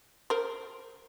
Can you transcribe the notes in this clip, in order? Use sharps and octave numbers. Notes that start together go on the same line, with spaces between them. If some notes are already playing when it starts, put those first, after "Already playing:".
A#4 C5